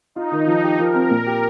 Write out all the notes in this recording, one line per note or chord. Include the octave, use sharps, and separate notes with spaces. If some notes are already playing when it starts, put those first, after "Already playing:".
D#4 F4
D#3
F3 D#4
G4
F3 A#4
C4
A#2
G4